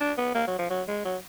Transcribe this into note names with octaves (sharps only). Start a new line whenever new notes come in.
D4
B3
A#3
F#3
F3
F#3
G#3
F#3